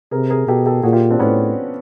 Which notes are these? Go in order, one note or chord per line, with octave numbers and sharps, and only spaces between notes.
C3 G#4 A#4
G#4 A#4
B2 G4 A4
G4 A4
A#2 F#4 G#4
F4 G4
C4 D4
A2 B3 C#4